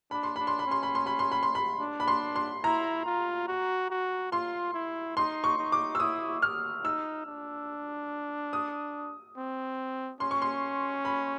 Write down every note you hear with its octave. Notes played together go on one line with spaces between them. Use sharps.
D4 B5
C6
D4 B5
C6
B5
C#4 C6
B5
C6
B5
C6
B5
C6
B5
D4
B5
C6
C6
E4 A#5
F4
F#4
F#4
F4 C6
E4
D#4 C6
C#6
D#4
D6
E6
E4 D#6
F6
D#4 E6
D4
D#6
C4
C#4 C6
C#6
C6
B5